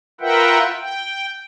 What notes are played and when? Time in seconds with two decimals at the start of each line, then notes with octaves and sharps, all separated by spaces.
0.21 F4 A#4 B4 E5 F#5 G5
0.79 G5